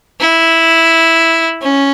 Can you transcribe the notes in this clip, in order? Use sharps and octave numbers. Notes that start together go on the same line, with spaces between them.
E4
C#4